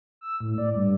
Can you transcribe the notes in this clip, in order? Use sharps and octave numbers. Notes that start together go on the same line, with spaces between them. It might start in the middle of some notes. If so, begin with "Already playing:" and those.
E6
A2
D5
G2